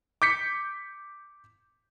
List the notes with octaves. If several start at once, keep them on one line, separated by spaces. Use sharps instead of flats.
D6 G6 B6 C#7